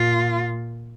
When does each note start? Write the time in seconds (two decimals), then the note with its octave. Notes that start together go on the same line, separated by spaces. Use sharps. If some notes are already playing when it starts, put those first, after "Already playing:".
Already playing: A#2 F4